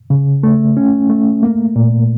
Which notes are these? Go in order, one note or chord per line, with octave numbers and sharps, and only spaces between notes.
C#3
A3
C#4
A3
A#3
A#2